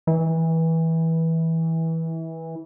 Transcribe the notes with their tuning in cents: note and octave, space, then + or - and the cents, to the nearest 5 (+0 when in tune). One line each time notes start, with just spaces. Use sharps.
E3 -20